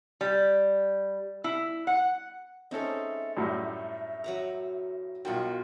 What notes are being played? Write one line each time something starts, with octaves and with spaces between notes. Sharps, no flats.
G3
E4
F#5
G#3 C4 C#4 D#4 A4 E5
F#2 A2 G3
F#3 B4 A#5
B1 F4 F#4 A#4 F#5 G5